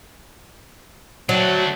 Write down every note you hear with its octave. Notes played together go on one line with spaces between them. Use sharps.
F#3 A3 D4